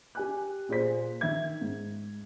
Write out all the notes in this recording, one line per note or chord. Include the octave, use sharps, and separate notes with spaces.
G4 G#5 F#6
A#2 G#4 C5 B6
D#3 E5 G#6
G#2